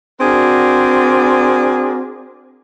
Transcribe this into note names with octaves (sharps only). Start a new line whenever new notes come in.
C4 D4 F#4 G#4 A#4 D5